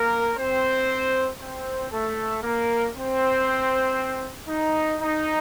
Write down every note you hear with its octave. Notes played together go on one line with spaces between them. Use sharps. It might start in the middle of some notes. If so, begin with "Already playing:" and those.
Already playing: A#3 A#4
C4 C5
C4 C5
A3 A4
A#3 A#4
C4 C5
D#4
D#4